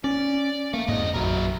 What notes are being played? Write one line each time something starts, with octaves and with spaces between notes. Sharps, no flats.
C#4 D5
A3 A#3
F2 G#2 D3 D#5
A#1 F#2 F#3 E4 A#4